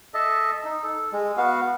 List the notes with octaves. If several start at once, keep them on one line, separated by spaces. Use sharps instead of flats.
A4 D#5 E5 A5
D#4
A4
G#3
B3 F#4 F5